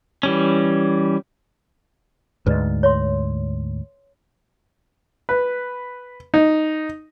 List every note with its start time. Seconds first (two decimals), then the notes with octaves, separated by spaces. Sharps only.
0.23 E3 G3 C#4
2.46 D2 G#2 B4 D5 D#5
2.83 C#5 E5 C6
5.29 B4
6.34 D#4